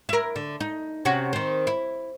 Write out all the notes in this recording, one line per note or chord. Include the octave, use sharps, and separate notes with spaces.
E4 A#4
D3
D#4
C3 C#4 F#4
D#3 C4
E4